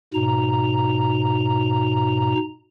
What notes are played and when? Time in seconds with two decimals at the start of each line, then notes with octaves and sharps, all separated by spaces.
0.14 G#2 B2 A#5